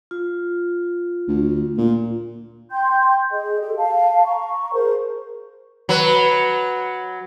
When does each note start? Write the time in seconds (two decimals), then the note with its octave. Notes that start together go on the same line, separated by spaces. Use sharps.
0.11 F4
1.28 D2
1.78 A#2
2.71 G5 C6 G6
3.31 G#4 D#5
3.60 G4 A4
3.77 F5 A5
4.26 A#5 C#6
4.73 G#4 A#4 C5
5.89 F#3 B4